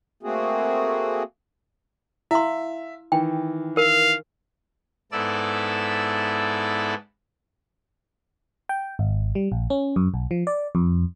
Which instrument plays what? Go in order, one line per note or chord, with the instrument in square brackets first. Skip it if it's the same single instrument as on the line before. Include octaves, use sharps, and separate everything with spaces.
[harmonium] A3 A#3 C4 F#4 G#4
[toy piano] E4 C6 [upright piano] E5 F5
[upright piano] D#3 E3 [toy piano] G5
[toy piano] A#4 [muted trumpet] F5
[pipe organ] G#2 B3 E4 A4 D5 E6
[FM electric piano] G5
G#1
G3
A#1
C#4
F#2
B1
F3
D5
F2